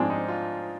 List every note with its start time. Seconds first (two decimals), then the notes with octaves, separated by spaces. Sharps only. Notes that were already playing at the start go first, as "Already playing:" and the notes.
Already playing: G#2 F3 G#3 C4 D4
0.10 D#4
0.28 F4